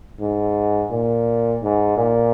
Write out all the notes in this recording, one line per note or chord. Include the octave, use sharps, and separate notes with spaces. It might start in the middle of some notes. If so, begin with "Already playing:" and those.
G#2
A#2
G#2
A#2